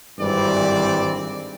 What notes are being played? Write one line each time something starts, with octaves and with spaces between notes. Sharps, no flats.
G#1 G2 E3 G3 C4 D5